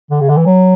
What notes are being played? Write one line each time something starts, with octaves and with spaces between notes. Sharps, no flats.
D3
C#3
D3
E3
F#3